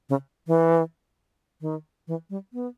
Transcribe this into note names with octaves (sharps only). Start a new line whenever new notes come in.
C#3
E3
D#3
E3
G3
B3